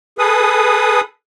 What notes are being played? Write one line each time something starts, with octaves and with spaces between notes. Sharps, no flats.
G#4 A4 B4 D#6